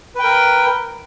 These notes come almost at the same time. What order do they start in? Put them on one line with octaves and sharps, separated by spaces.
B4 G5 A#4